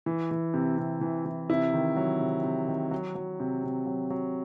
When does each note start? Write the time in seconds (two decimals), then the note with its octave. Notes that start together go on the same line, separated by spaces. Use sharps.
0.06 E3
0.31 E3
0.54 C3
0.78 C3
1.01 E3
1.26 E3
1.49 C3 E4
1.73 D#3
1.96 F#3
2.20 C3
2.44 C3
2.68 D#3
2.91 F#3
3.15 F#3
3.40 C3
3.63 C3
3.86 F#3
4.10 F#3